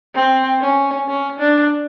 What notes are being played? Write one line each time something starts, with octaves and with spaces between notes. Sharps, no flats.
C4
C#4
C#4
D4